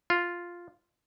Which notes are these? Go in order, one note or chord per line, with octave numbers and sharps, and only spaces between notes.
F4